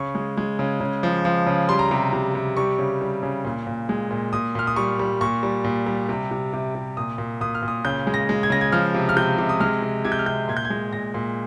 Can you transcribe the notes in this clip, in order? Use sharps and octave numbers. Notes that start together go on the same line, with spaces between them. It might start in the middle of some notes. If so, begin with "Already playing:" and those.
Already playing: C#3 C#6
G#3
G#3
C#3
C#3
F3
F3
C#3
G3 C6
A#5
C3 C6
C3
C3
G3 C#6
C#3
G3
C#3
A#2
A#2
G#3
A#2
A#2 D#6
A#2 F6
D#6
G3 C#6
G3
A#2 C#6
G3
A#2
G3
C3
C3
C3
C3
A#2 D#6
A#2
A#2 D#6
F6
A#2
D#6
C#3 G6
G#3
A#6
G#3
G#6
C#3 A#6
G#6
F3 F6
C3
F6
C3 G6
C3
D#6
G#3 F6
C3
C3 G#6
G6
F6
C3 G6
A#2 G#6
G6
G#6
G#3
A#2 A#6
A#2